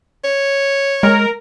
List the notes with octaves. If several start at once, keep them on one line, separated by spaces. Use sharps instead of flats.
C#5
G#3 A#4